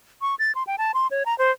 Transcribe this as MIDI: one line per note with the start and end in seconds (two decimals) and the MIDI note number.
0.22 0.35 85
0.39 0.52 93
0.55 0.63 84
0.67 0.76 79
0.78 0.92 81
0.94 1.07 84
1.11 1.23 73
1.26 1.36 82
1.38 1.51 72